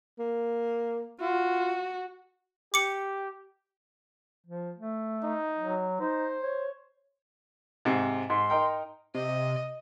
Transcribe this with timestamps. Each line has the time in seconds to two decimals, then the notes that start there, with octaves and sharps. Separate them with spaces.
0.19 A#3
1.21 F4 F#4
2.74 G4 D6 C#7
4.47 F3
4.78 A3
5.23 D#4
5.59 F#3
6.01 D#4 C5
6.41 C#5
7.85 G#2 C3
8.30 G#2 C6
8.50 D#4 A#4 G5
9.15 C3 D#5